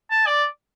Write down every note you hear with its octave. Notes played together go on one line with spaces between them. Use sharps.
A5
D5